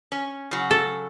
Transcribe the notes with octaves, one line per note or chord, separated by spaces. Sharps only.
C#4
C#3 F#3
A4